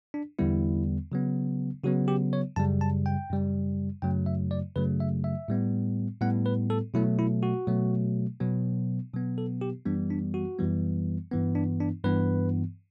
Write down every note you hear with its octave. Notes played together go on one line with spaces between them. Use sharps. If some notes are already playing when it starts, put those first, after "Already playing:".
D4
E2 D3 G3 B3 E4
C#3 F#3 B3
C#3 F#3 B3 F#4
G4
C#5
F#2 C#3 G3 A5
A5
G5
F#2 C#3 G3
F#2 C#3 F#3 A3 G5
E5
D5
F#2 C#3 F#3 A3 B4
E5
E5
A2 G3 B3
A2 G3 B3 F#5
B4
A4
B2 F#3 A3 E4
E4
F#4
B2 F#3 A3
B2 F#3 B3
B2 F#3 B3
A4
G4
F#2 E3 G3 B3 D4
D4
F#4
F#2 E3 G3 B3
G2 E3 B3
D4
D4
G2 E3 B3 B4